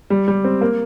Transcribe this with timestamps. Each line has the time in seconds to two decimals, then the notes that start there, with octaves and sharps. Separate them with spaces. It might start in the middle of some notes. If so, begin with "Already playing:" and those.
0.10 G3
0.28 G3
0.44 C4
0.61 A#3